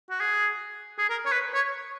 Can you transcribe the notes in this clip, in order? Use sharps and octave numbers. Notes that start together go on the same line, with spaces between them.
F#4
G#4
G#4
A#4
C#5
B4
C#5